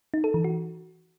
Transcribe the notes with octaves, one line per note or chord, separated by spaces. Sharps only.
D#4
A4
E3
F#4